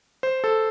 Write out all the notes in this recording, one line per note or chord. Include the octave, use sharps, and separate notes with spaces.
C5
A4